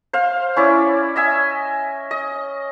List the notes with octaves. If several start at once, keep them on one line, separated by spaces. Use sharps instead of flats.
C5 F5
C#4 E4 D5
D#5 E5 G#5
D#5